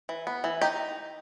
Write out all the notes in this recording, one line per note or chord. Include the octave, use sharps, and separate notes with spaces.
E3
B3
E3
D#4 G4